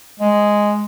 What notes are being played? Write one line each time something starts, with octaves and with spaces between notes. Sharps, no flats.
G#3